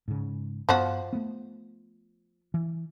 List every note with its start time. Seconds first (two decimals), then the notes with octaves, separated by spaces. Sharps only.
0.08 G#2 C#3
0.69 G2 F3 B3 F#4
1.13 A3 B3
2.54 E3